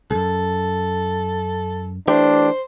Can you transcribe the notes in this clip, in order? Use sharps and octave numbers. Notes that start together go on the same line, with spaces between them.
C2 F#2 A4
E3 A3 D4 G4 C5